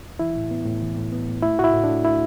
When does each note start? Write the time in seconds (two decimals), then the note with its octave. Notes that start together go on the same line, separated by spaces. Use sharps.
0.19 E3 E4
0.35 A2
0.51 B3
0.66 A2
0.82 E3
0.96 A2
1.12 B3
1.28 A2
1.42 A3 E4
1.59 A2 F#4
1.64 E4
1.74 A2
1.84 D4
1.89 A3
2.04 A3 E4